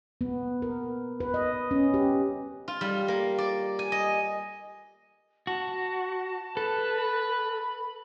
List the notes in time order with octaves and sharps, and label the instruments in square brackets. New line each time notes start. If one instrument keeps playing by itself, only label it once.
[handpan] B3
A#4
B4
D#5
C#4
G4
[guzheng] F4
G3
A#3
D5
G#5
D#5
[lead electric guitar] F#4 [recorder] A5
[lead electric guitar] A4 [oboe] B4
[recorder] B5